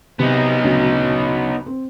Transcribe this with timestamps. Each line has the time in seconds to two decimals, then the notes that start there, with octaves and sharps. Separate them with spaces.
0.19 C3 B3 D#4
0.64 D2 C#3 F#3
1.66 C4